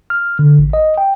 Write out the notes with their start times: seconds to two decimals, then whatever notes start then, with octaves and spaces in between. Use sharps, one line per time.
0.10 F6
0.39 D3
0.59 A1
0.73 D#5
0.98 G5